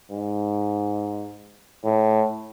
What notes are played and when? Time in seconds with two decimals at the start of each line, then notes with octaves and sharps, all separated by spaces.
0.11 G#2
1.85 A2